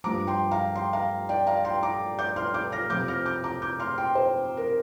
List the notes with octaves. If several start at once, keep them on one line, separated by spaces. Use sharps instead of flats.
G2 F3 A#5 D6
G5 C6
F5 A#5
G5 C6
F5 A#5
D5 G5
F5 A#5
G5 C6
A#5 D6
D6 G6
C6 F6
D6 G6
F6 A#6
F2 C3 F3 D6 G6
F6 A#6
D6 G6
A#5 D6
D6 G6
C6 F6
G5 C6
C5
A#4